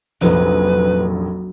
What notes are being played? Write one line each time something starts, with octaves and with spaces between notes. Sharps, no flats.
F1 A#1 F#3 B4